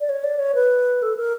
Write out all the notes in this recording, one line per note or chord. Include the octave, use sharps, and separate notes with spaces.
D5
C#5
D5
C#5
B4
A4
A#4